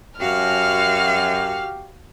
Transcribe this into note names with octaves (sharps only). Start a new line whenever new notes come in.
F#2 F#4 G4 F5 F6